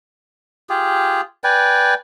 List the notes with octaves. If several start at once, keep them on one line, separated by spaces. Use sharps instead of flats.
F4 G4 G#4
B4 D5 G5 G#5